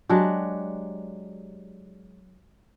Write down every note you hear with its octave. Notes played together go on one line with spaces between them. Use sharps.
F#3 G#3 D4 G4